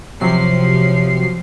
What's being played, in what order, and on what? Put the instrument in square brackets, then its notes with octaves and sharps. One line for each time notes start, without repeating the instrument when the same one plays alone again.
[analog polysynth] C3 F#3 C7 [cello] F3